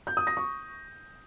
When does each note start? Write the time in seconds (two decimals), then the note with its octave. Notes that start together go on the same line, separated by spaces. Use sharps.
0.07 G6
0.17 D#6
0.27 A#6
0.37 C#6